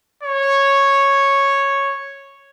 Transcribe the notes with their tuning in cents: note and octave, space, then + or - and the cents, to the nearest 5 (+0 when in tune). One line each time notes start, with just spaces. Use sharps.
C#5 -5